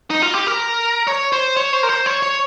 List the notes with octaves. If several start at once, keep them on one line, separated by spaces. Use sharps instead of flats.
D#4
F4
G4
A#4
C#5
C5
C#5
C5
A#4
C5
C#5
C#5